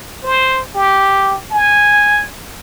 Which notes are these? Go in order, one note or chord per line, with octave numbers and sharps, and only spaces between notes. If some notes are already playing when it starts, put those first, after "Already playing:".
C5
G4
G#5